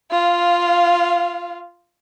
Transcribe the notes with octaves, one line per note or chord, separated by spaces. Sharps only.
F4 F5